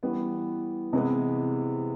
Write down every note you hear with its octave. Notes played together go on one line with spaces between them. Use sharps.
E3 G3 B3
C3 E3 G#3 B3